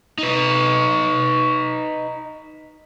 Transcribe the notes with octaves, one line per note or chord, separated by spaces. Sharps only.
D#4 B4